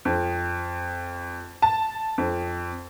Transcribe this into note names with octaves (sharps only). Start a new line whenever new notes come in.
F2
A5
F2